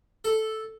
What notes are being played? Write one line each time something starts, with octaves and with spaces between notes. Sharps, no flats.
A4